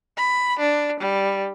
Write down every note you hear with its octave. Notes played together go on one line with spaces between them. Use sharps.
B5
D4
G3